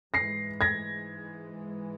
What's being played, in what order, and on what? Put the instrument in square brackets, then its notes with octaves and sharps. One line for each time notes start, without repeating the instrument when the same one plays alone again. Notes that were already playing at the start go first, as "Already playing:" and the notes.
[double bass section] G#2 E3 G#3 [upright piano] A#6 C7
[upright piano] G#6 A#6